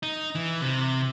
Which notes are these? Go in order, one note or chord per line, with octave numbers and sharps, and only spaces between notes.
D#4
E3
C3